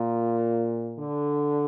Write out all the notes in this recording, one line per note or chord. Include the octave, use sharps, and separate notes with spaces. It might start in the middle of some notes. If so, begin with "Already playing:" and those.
Already playing: A#2
D3